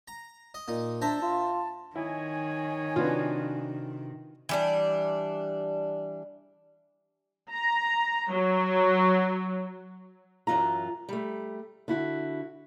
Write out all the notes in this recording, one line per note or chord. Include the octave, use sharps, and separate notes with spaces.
A#5
D#5
A#2 D#4
D4 C5 E5 A5 A#5
F4
D#3 E4 C#5 D#5 G#5
C3 D4 F4 F#4 B4
E3 G3 D4
A#5
F#3
F#2 E3 F#3 F4 A#5
G3 A3
D3 E4 F#4